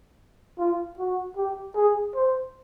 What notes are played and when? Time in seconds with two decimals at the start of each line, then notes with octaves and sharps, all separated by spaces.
0.59 F4
0.99 F#4
1.37 G4
1.76 G#4
2.15 C5